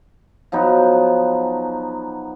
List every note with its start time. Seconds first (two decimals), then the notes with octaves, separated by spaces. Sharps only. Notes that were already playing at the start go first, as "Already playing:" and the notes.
0.52 F3 F#3 B3 D#4